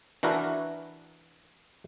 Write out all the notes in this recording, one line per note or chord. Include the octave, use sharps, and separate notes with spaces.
E3 D4 F#4 A#4 B4 E5